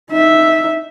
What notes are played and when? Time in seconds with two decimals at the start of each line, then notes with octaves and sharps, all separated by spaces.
0.12 D#4 E5